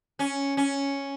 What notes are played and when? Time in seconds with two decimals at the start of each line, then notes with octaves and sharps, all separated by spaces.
0.19 C#4
0.57 C#4